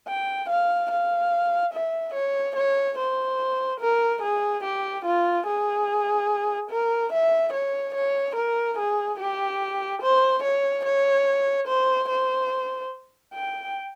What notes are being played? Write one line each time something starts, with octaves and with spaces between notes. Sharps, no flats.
G5
F5
F5
E5
C#5
C#5
C5
A#4
G#4
G4
F4
G#4
A#4
E5
C#5
C#5
A#4
G#4
G4
C5
C#5
C#5
C5
C5
G5